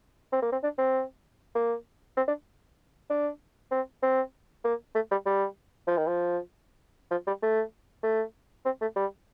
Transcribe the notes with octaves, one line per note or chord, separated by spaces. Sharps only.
C4
A#3
C4
D4
C4
A#3
C4
D4
D4
C4
C4
A#3
A3
G3
G3
F3
D#3
F3
F3
G3
A3
A3
C4
A3
G3